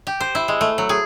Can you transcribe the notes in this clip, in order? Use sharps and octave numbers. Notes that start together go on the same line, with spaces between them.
G4
C5
E4
G#3
A3
F#3
G#4